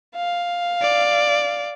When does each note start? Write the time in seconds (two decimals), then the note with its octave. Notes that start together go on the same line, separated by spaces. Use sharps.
0.15 F5
0.82 D5